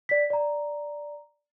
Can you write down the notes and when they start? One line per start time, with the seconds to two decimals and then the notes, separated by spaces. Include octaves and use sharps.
0.09 D5 B6
0.30 D5 A#5